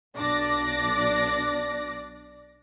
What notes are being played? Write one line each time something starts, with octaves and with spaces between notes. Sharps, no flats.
B1 D4 D5 D6 A#6